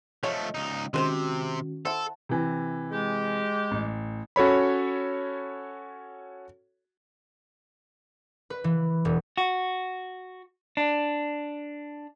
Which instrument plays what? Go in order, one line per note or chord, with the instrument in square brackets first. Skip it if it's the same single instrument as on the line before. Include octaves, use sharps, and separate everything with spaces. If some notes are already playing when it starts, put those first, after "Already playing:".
[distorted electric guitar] F3 A3 [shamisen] C#5 [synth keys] D#5
[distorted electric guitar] C#2 D#4
[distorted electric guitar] C3 [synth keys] D#3 C#4 F#4 [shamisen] G#3 B4 C5
[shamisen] E4 C5 [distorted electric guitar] A4 [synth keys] F#5 A5
[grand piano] C3 E3
[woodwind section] G#3 G4
[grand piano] A1
[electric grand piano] C#4 F#4 A4 C#5 B5
[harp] B4
E3
E1
[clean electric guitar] F#4
D4